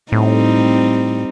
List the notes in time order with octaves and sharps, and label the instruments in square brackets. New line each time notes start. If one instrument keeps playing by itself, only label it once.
[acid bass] A2 [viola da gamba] G3 C4 D#4